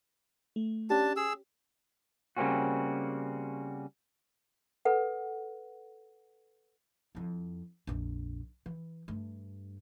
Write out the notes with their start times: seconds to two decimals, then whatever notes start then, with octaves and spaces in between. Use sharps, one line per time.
0.56 A3
0.90 C#4 D4 G4 A5
1.16 G#4 E6
2.37 C#3 G3 A#3 C4 C#4 F#4
4.85 A4 B4 F#5
7.15 F2 E4
7.87 A#1 F2
8.66 E3
9.08 G2 A3